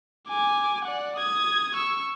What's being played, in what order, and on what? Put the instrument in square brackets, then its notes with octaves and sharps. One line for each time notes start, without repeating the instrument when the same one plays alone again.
[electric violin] G#5 D6
D5 F#5
D#6 G#6
C#6 E6